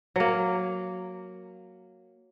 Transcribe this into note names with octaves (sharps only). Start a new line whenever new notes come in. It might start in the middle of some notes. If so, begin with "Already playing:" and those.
F#3 A#3